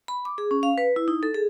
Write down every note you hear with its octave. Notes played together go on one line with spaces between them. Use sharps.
B5
D6
G#4
C#4
F5
B4
E4
D#4
A4
G#4